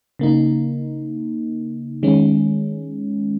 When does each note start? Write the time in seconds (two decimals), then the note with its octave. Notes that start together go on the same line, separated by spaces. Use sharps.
0.19 C#3 A#3 D#4
2.03 D#3 G#3 C#4